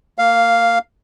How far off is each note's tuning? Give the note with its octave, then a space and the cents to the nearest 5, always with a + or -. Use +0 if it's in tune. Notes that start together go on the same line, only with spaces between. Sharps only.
A#3 -25 F5 +0